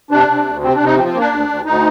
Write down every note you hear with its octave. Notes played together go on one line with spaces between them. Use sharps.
C3 D4
C3
D2
C3 C4
C3 D4
D#4
F3 C4
C4
A#3
D4
D2
D2
D2 D#4